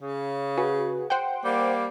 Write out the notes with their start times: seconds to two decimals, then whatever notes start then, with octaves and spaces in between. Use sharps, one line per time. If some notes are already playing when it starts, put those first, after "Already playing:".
0.02 C#3
0.58 F#4 G#4 B4
1.10 C5 F#5 G5
1.44 G3 A#3